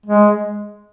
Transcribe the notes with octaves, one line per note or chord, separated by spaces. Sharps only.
G#3